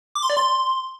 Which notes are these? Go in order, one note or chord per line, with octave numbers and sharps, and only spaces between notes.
D6
C6
D5
C6